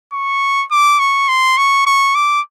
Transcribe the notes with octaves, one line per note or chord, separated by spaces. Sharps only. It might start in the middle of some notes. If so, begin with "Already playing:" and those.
C#6
D6
C#6
C6
C#6
C#6
D6